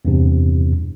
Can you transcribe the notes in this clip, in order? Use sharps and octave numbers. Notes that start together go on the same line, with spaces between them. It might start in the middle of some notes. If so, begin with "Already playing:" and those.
E2 G2 C3